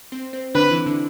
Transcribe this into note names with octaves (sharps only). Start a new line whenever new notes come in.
C4 C5
C4 C5
D3 D4 B4
E3 E4
D3 D4